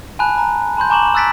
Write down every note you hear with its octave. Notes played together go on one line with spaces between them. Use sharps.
G#5 A5 B5 F#6
A#5
A5 B5 C6 G6
G#5 A#5 C#6 D6 E7 F#7
E6 F#6 A6 B6 D7